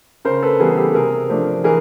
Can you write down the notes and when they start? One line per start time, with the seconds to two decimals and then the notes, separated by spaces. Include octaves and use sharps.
0.25 C#3 A#4 C5
0.43 A4 B4
0.59 E3 G3 B3 G#4 A#4
0.77 G4 A4
0.94 C3 G#4 A#4
1.29 F3 A3 D4
1.64 E3 G#4 A#4